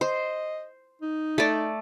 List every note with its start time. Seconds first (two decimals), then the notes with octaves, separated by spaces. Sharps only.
0.01 C5 D#5
1.01 D#4
1.38 A3 D5